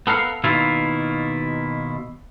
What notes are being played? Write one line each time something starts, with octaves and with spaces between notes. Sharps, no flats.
B3 A4 A#4 F5
B2 D#3 A#3 E4 F4